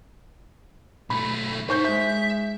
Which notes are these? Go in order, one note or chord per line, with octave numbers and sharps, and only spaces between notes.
B1 A3 B5
G#2 D#4 C5 C#6 G6
G#3 E5 G6